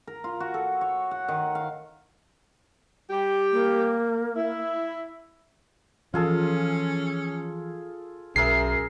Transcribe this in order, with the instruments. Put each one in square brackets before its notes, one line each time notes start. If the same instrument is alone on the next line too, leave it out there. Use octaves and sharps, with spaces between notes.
[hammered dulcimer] A#4
F4
F#4
A4
C#5
F#5
D#3
F5
[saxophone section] G3 G4
[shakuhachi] A#3
[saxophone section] E4
[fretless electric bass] E3 F3 [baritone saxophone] C#4 [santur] F4 G#4 A4
[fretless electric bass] B1 [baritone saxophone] F#2 [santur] G#4 A#4 E5 [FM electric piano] C7